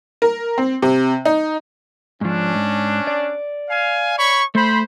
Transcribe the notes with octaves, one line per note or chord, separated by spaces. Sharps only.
A#4
C4
C3
D#4
G#2 F3 C#4 D4
G#2
D5
F5 G#5
C#5 B5 C#6
A3 C5 B5